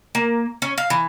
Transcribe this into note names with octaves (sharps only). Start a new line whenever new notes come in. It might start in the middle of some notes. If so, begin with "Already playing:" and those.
A#3
C#4
F5
E3